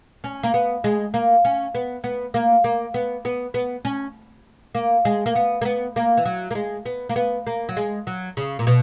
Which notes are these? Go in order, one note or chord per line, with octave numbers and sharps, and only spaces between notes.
C#4
A#3
B3
G#3
A#3
C#4
B3
B3
A#3
A#3
B3
B3
B3
C#4
A#3
G#3
A#3
B3
A#3
B3
A#3
E3
F#3
A#3
G#3
B3
A#3
B3
A#3
F#3
G#3
F#3
C#3
A#2
B2